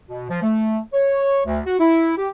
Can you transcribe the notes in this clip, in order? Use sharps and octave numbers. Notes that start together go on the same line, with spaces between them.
B2
F3
A3
C#5
D2
F#4
E4
G4